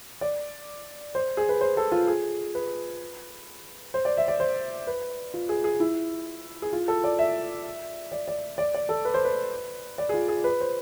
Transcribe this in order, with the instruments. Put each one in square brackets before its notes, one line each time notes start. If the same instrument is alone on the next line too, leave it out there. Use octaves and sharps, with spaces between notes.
[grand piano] D5
C5
G#4
B4
C5
A4
F4
G#4
B4
C5
D5
E5
D5
C5
B4
F4
G#4
G#4
E4
G#4
F4
A4
D5
E5
D5
D5
D5
D5
A4
B4
C5
B4
D5
G#4
F4
G#4
B4
C5